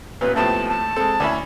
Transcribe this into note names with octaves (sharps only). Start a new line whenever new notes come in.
A1 A#2 B3 B4
D#2 A2 F3 A3 B3 C4 A5
A5
G#3 C4 A4
D2 C#4 E4 D5 G#5 B5